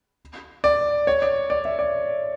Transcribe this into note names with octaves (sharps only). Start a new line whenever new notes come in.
D5
C#5
D5
D5
E5
D5